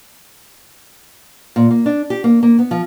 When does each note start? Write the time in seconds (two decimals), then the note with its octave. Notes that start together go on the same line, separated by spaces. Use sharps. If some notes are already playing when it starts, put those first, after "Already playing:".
1.56 A#2
1.70 A#3
1.86 D4
2.10 G4
2.24 A#3
2.43 A#3
2.59 B3
2.71 F3